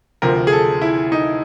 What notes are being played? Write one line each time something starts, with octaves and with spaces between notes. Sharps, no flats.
D2 C3 F3 A#4
G#4
A4
E4
D#4